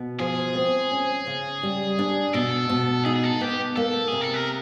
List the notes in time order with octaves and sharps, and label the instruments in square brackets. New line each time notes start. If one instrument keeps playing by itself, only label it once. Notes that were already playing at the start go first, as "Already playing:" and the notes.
Already playing: [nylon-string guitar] B2
[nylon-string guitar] F3 [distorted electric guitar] G#4
[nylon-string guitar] C4
C#4
C#3
G3
D4
[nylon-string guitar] B2 [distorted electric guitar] A4
[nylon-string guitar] B2
[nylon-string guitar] D#4 [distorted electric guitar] G#4
[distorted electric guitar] G#4
A4
[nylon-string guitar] B3 [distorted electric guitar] G4
[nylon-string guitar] A#3 [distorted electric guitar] A4
[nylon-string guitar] C3 [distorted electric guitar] G#4
[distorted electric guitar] A4
A#4